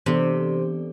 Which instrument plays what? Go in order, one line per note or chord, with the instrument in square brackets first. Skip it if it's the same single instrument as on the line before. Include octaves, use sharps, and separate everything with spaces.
[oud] C3 [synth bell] E3 B3 D4 A4 D5